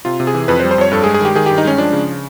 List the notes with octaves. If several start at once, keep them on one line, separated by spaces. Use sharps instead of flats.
C3 F4
C3
G#4
E3
F2 B4
C5
G3
C5
F2 C#5
G2 A4
G#4
G#3
G#4
D#3 G4
D#3 G#4
G2 G4
D#4
G#3 C#4
F3 D4
C#3